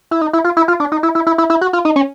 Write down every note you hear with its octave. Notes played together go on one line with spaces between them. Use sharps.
E4
D#4
E4
F4
E4
F4
D4
D#4
E4
E4
E4
E4
E4
F#4
F4
D#4
C#4